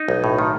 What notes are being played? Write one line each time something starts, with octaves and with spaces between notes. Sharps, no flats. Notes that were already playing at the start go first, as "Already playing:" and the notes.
Already playing: D#4
B1
A2
D#3